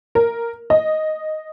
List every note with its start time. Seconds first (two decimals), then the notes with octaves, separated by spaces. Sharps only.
0.15 A#4
0.70 D#5